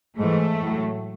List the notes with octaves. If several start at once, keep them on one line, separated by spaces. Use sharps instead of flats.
G#2 E3 A3
A2 F#3